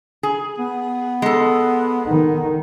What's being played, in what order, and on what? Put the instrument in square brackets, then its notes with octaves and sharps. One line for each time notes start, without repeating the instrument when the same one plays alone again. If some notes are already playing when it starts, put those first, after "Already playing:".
[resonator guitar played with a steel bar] G#4
[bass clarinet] B3
[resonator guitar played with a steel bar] G#3 A4
[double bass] D#3